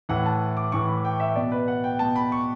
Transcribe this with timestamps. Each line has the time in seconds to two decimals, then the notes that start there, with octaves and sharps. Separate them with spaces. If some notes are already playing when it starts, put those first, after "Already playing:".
0.09 A2 E3 F#5
0.26 A5
0.57 D6
0.72 A2 E3 C#6
0.88 B5
1.05 G5
1.20 E5
1.36 B2 D5
1.52 B4
1.68 F#5
1.84 G5
1.99 B2 A5
2.16 B5
2.32 C#6